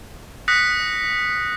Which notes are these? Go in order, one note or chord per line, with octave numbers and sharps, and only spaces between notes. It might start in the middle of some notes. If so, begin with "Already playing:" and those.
D#6 F#6 A#6 B6 C#7